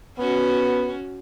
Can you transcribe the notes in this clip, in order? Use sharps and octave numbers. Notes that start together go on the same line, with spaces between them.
B3 C#4 F#4